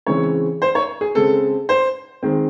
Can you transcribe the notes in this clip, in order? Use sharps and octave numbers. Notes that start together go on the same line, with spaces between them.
C#3 E3 G#3 C4 C#5
C5
C#5
G#4
C#3 G#3 C4 A4
C5
D#3 G#3 C4